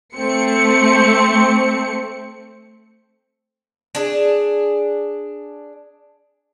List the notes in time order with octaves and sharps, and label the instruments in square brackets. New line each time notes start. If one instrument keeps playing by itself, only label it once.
[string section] A3 C4 C#7
[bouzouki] D4 G#4